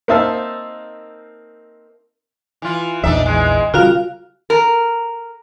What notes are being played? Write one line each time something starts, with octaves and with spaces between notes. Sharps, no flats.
A#3 C4 D#4 E5 F5 A5
E3 F4
A#1 E2 D4 D#4 E5
E3 G#3
C#3 G3 F4 F#4 A#4 F5
A#4